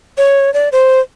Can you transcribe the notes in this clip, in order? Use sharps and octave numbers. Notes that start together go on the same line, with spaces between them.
C#5
D5
C5